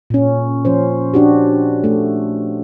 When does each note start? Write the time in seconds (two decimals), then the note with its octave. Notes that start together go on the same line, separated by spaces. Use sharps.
0.10 A#2 C#4
0.65 F3 C#4 C5
1.14 D4 F#4 G4
1.84 A3